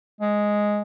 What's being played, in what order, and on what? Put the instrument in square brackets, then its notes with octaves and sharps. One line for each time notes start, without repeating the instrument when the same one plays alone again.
[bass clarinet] G#3